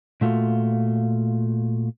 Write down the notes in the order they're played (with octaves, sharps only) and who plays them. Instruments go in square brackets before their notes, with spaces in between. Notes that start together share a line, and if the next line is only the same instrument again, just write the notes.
[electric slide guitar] A#2 A3 F4 F#4